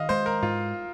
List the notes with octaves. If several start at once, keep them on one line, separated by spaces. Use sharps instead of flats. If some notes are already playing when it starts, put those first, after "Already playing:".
Already playing: D#3 D#5 F5
G#3 C5
A#4
G#2 F4